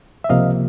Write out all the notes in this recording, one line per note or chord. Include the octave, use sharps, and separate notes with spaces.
E5
C#2 C3 F3 A#3 D#5 F5